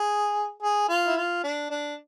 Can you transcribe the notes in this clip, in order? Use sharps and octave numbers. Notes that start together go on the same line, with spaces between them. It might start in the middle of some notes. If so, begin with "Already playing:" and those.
Already playing: G#4
G#4
F4
E4
F4
D4
D4